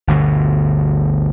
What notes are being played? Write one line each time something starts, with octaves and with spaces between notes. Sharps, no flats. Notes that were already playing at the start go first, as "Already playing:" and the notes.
G1 D2 B2 D3